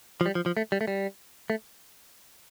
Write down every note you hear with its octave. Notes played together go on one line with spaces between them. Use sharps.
F3
G3
F3
F3
A3
G3
A3
G3
A3